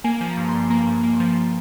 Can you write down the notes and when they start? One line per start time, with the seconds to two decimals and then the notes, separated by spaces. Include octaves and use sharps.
0.04 A#3 G#5
0.21 F3
0.27 A#5
0.37 G2
0.48 C6
0.54 G2
0.70 A#3 A#5
0.87 G2
1.03 A#3
1.20 F3